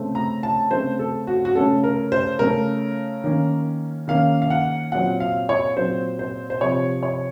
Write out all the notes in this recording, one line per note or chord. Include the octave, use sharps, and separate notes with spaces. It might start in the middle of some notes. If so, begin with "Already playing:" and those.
Already playing: C#3 A3 C4
A#5
A5
C#3 A3 C4 C5
A4
F#4
F#4
C#3 A3 C#4 A4
A#4
C5
C#3 A3 C#4 A#4
D#3 A#3 C#4
D#3 A#3 C#4 F5
F5
F#5
A#2 F#3 C4 F#5
F5
C#5
A#2 F#3 C4 C5
C5
C5
C3 F3 C4 C#5
C#5